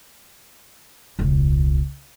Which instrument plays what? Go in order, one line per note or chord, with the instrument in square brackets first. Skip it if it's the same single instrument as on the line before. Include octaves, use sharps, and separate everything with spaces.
[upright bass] E1 C#2